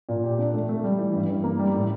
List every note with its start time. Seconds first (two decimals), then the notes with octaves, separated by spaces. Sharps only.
0.09 A#2
0.24 G4
0.38 D4
0.54 A3
0.69 A3
0.84 G3
0.99 E3
1.14 G2
1.29 G2
1.44 A#3
1.59 G3
1.74 A2